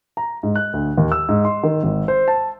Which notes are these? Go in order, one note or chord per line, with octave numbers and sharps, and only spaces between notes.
A#5
G#2
F#6
D2
D#2
E6
G#2
C6
D#3
G#1
C5
A5